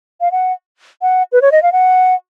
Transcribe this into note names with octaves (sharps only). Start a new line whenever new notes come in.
F5
F#5
F#5
B4
C#5
D#5
F5
F#5